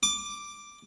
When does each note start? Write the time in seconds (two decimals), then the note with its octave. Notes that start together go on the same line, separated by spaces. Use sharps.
0.03 D6